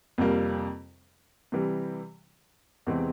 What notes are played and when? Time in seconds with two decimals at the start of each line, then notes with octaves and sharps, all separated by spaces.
0.18 F2 C3 G3 A#3
1.52 C3 E3 G3
2.87 E2 C3 E3 G#3 C4